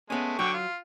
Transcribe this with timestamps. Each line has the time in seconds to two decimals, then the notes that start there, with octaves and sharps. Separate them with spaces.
0.10 G#3 A3 B3 C#4
0.39 D3 F#3 G5 C#6
0.53 F4